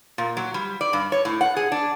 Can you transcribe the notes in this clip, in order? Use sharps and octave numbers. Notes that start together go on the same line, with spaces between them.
A#2
F#3
G3
D5
G2
C#5
A2
F#5
G#4
D4